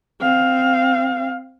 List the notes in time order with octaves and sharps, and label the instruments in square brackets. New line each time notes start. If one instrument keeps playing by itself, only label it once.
[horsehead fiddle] C4 F5